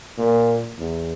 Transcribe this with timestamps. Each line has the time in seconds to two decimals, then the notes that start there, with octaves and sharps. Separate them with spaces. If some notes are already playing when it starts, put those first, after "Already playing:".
0.18 A#2
0.78 E2